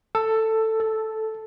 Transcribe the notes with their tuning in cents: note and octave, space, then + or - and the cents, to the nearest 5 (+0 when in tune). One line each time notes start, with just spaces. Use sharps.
A4 +10
A4 -5